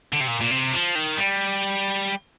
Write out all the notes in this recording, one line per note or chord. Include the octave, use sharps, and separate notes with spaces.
D3
C3
A#2
A#2
C3
F3
D#3
G3